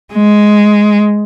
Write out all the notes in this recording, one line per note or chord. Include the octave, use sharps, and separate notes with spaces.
G#3